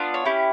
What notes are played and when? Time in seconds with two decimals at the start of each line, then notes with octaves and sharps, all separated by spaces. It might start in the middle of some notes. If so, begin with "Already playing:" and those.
Already playing: B3 D4 F4
0.14 C#5
0.25 C#4 E4 G4